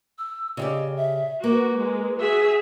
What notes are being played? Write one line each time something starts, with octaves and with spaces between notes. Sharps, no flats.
E6
C#3 G4 D5 D#5
E5
A#3 F#4 B4
G#3
F#4 G#4 E5